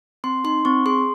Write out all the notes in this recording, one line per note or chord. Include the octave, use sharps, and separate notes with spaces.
C4 C6
D#4 C6
C4 C#6
G#4 C6